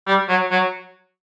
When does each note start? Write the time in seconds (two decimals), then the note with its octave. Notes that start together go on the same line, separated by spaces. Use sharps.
0.07 G3
0.29 F#3
0.51 F#3